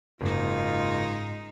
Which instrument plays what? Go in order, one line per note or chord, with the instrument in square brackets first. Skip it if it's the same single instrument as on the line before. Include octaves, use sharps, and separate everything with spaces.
[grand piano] F#1 [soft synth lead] G#2 [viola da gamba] G#3 D#4 [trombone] F4